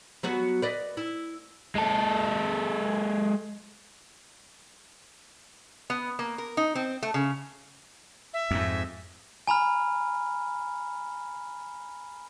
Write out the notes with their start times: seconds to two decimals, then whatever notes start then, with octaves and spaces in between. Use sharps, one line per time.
0.23 F#3 B3 F#4
0.62 B4 D5 D#5
0.97 E4
1.76 G#3 A4
5.90 B3
6.19 A#3
6.38 A#4
6.57 D#4
6.75 C4
7.03 A3
7.14 C#3
8.34 E5
8.51 F2 G#2
9.47 G#5 A#5 B5 F6